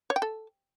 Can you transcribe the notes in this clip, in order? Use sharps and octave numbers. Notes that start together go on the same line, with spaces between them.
C#5
G5
A4